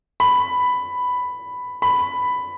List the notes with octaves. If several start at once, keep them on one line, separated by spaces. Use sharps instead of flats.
B5
B5